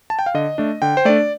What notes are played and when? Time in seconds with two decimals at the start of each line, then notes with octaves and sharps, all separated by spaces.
0.10 A5
0.19 G5
0.26 F5
0.34 D3 D#5
0.58 A3 D4
0.82 D3 G5
0.97 C5
1.05 A3 D4 D5